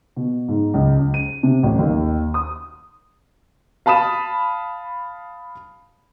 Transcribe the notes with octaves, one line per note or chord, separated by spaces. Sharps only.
B2
G#2
C#2
C#2
D#7
C3
A1
D#2
D#6
F5 A5 B5 D#6 E7